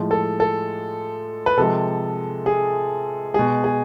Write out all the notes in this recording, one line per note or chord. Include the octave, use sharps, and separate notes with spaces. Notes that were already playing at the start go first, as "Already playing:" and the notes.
Already playing: A2 F3 G#3
A4
A4
B4
C3 F3 G#3 A4
G#4
B2 G#3 G#4
G#4